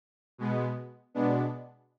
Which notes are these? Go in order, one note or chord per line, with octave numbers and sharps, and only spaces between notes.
B2 G#3 B3
B2 G#3 B3 D4